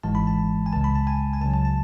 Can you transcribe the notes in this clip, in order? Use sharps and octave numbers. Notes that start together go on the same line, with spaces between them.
G#1 G#2 E3 G#3 A5
B5
A5
G#5
C#2 C#3 G#3 A5
B5
A5
G#5
G#5
C#2 C#3 F#3 A5
A5
A5